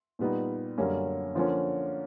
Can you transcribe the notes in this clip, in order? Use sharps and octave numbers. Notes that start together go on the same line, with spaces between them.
A#2 G3 B3 D#4
F#2 D3 G3 A#3 C#4
D3 F3 A#3 C#4